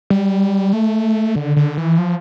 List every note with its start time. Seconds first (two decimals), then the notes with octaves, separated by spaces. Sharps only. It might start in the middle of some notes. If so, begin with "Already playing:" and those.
0.10 G3
0.73 A3
1.36 D3
1.57 D3
1.77 E3
1.98 F3